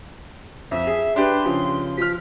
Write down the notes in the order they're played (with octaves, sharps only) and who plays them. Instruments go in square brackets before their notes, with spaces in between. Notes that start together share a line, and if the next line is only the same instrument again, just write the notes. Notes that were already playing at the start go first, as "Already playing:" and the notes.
[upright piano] F2 [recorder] E5
[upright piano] G#4
[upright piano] D4 G4 B4 [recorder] C6
[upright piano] C#3 F3
[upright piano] F3 F6 [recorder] B6